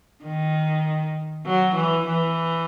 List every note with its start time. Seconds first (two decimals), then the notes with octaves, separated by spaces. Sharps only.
0.24 D#3
1.45 F#3
1.75 E3
2.06 E3